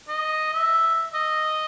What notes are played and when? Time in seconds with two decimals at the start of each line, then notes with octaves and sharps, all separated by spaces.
0.08 D#5
0.53 E5
1.14 D#5